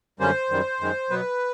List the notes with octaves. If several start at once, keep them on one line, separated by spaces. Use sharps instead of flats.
F#2 D3 G3 A#3 C#4 C5
F#2 D#3 G3
F#2 D#3 G#3
B2 F#3 B3 B4